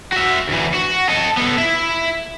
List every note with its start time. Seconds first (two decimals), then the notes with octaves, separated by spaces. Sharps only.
0.13 F#4 E5
0.49 D2 E3
0.74 F#4
1.09 A4 D#5
1.37 B3 A4
1.58 E4 E5